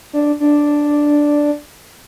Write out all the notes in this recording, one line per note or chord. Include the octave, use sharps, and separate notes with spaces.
D4
D4